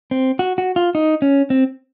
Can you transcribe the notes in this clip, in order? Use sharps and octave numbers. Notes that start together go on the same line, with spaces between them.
C4
F#4
F#4
F4
D#4
C#4
C4